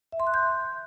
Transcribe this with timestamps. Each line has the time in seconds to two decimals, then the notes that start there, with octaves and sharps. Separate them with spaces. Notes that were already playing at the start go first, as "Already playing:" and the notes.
0.12 E5
0.20 C6
0.27 F#6
0.34 G6